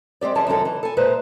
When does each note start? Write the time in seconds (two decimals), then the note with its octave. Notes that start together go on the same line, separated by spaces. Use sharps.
0.21 G#3 C4 G4 D5
0.35 F#2 E3 G3 C#4 G#4 A5
0.47 F#2 C3 D#3 G#3 A4
0.65 E3
0.83 A4 G#5
0.97 A#2 G#3 B4 C5 E5 A#5